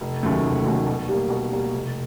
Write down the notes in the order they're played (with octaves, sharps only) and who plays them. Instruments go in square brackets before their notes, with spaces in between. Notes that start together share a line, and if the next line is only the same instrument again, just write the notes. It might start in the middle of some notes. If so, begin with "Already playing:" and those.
[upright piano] F1
D#2 C#3 F#3 A3
F1
D#2 C#3 F#3 A3
B2
G3 A#3
B2
G3 A#3
F1